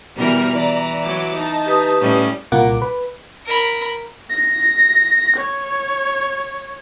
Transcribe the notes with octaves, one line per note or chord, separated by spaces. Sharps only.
B2 E3 G3 A#4 F6
E3 D5 A#5
F#3 D6
D#4 A5
G4 B4 D#6
A2 G3 C#4
C2 A#2 A#3 F#5 D6
B4
A#4 B5
A#6
C#5